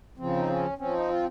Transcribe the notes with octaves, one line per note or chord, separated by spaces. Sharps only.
C#3 F3 C4
D#4
C#4
F3 C4 C#4
D#4
F4